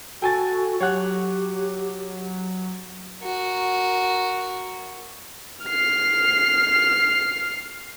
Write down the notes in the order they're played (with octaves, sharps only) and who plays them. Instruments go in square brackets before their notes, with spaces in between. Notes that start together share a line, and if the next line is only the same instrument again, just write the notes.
[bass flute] F#4 [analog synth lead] A4 [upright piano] G5 G#5 A6
[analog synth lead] F#3 [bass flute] G4 [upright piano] C#5 F#5 F#6
[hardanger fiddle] F#4 A#4
[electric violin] F6 C7